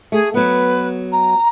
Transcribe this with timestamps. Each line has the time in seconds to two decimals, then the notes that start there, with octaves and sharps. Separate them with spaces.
0.12 A3 G#4
0.34 F#3 B3 B4
1.12 A#5